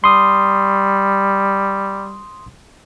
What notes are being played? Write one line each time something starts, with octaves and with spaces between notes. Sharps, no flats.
G3 C6 D#6